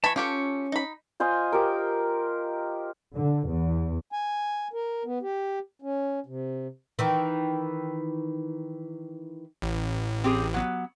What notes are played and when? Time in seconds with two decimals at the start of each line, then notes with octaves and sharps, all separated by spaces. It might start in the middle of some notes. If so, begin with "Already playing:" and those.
0.04 E3 G#5 A5 B5 C#6
0.16 C#4 F4 G4 A4 C#6
0.72 D#4 B5
1.20 F4 C5 D#5 G#5
1.52 G4 A#4
3.14 D3
3.48 E2
4.12 G#5
4.73 A#4
5.05 B3
5.22 G4
5.82 C#4
6.26 C3
6.99 D#3 E3
9.62 A1
10.24 C4 G4 G#4
10.54 F#3 B3